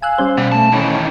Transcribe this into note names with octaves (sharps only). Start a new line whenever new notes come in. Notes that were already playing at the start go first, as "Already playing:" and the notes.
F5 G#5 E6 F#6
G3 C#4 C5
B2 G3
A3 A5
D#3 E3 C#4